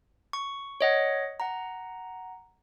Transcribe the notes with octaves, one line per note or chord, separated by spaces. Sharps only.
C#6
C#5 D#5 F#5
F#5 A#5